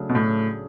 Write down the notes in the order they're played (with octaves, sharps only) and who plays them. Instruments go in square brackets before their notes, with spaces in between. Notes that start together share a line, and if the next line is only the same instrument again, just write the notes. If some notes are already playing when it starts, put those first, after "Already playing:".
Already playing: [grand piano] C#3 F#3 A3 D4
[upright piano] B2
A2